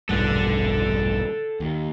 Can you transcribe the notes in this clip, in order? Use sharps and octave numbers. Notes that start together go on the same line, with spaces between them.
E1 A#1 G2 A4 F#5
D#2